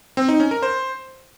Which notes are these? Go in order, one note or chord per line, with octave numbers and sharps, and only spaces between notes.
C4
D#4
C#4
A#4
C5